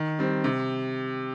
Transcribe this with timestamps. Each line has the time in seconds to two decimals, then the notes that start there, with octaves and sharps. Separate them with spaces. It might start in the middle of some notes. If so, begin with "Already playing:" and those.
Already playing: D#3
0.19 G3 C4
0.44 C3